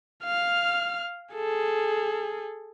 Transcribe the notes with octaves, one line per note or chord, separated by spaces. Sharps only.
F5 F6
G#4 A4